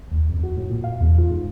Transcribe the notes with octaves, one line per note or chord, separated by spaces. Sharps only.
D#2
F2
F#4
A2
A#2
F5
E2
F4
G#2